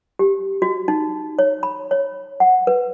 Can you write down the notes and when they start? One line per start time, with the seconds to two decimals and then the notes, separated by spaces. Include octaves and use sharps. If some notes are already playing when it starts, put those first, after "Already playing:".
0.19 G4
0.62 F#4
0.88 D#4
1.39 C#5
1.63 B5
1.91 C#5
2.40 F#5
2.67 B4